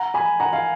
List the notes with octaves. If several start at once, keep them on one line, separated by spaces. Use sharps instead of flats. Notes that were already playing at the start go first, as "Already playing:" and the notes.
Already playing: F#5 A#5
G#5 B5
F#5 A#5
F5 G#5